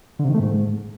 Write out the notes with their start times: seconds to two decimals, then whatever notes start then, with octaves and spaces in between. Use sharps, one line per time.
0.19 D3
0.24 C3
0.29 D#3
0.34 A3
0.40 G#2